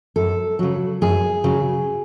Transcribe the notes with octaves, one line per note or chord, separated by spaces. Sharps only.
F#2 A4
C#3 F#3
F#2 G#4
C#3 F#3